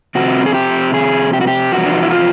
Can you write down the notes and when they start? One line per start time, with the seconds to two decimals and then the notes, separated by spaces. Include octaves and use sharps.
0.15 C3 F3 A3 C4 F#4
0.46 G#4
0.54 G4
0.94 G#4
1.33 G4
1.41 F#4
1.47 G4
1.72 E2 C3 F3 F#4
1.86 D4
1.94 D#4
2.03 E4
2.11 F4